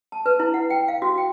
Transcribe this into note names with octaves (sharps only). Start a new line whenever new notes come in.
A5
B4
E4
F#5
G5
F5
F#4
G5